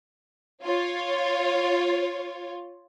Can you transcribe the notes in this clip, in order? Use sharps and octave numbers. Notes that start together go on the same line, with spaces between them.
F4 C#5